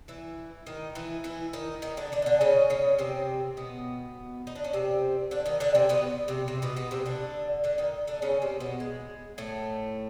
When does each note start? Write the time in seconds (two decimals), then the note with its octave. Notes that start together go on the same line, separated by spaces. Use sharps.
0.08 E3 E4
0.67 D#3 D#4
0.95 E3 E4
1.24 E3 E4
1.53 D#3 D#4
1.82 D#3 D#4
1.97 D3 D4
2.12 D3 D4
2.22 D#4
2.26 D3 D4
2.41 C#3 C#4
2.70 C#3 C#4
2.99 C3 C4
3.57 B2 B3
4.47 D#4
4.55 D4
4.64 C#4
4.73 C3 C4
5.31 D3 D4
5.46 D#3 D#4
5.60 D3 D4
5.75 C3 C4
5.89 B2 B3
6.28 C3 C4
6.48 C3 C4
6.62 B2 B3
6.76 B2 B3
6.91 C3 C4
7.06 D3 D4
7.64 D3 D4
7.78 D#3 D#4
8.07 D3 D4
8.22 C#3 C#4
8.42 C3 C4
8.60 B2 B3
8.80 G#3
9.38 A2 A3